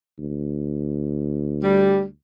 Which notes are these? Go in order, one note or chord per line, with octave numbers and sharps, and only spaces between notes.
D2
G3